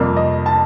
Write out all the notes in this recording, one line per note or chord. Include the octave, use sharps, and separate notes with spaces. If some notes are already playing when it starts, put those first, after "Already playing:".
Already playing: F2 C3 G3 A#3
D#5
A5